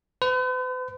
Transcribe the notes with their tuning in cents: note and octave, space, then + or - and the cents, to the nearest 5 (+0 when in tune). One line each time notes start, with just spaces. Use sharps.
B4 +45